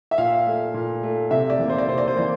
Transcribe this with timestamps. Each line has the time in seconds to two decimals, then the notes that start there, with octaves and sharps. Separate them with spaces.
0.11 E5
0.18 A#2 F5
0.47 A3
0.74 A#2
1.03 A3
1.31 C3 E5
1.50 D5
1.59 E3 A#3
1.69 C5
1.78 D5
1.88 C3 C5
1.98 D5
2.08 C5
2.16 E3 A#3 D5